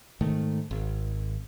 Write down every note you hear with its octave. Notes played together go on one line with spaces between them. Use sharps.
G#2 D#3 A3
G#1